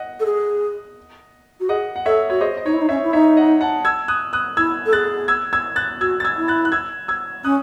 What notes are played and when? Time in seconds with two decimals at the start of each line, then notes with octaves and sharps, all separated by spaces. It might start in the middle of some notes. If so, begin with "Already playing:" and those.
Already playing: D#5 F#5
0.19 A4
0.25 G#4
1.60 F#4
1.69 G#4 D#5 F#5
1.96 F#5
2.05 A4 C#5 E5
2.30 F#4 C#5
2.41 G#4 C5 D#5
2.57 D#5
2.65 D#4 C#5
2.73 E4
2.81 D#4
2.89 C#4 C#5 E5
3.03 E4
3.13 D#4 C#5 E5
3.37 D#5 F#5
3.61 F#5 A5
3.85 E6 G#6
4.08 D#6 F#6
4.33 D#6 F#6
4.57 E4 E6 G#6
4.85 A4
4.93 G#4 F#6 A6
5.28 E6 G#6
5.53 E6 G#6
5.76 F#6 A6
6.00 F#4 E6 G#6
6.20 A6
6.24 E6 G#6
6.37 E4
6.48 F#6 A6
6.65 F#6
6.72 E6 G#6
7.08 E6 G#6
7.44 C#4 D#6 F#6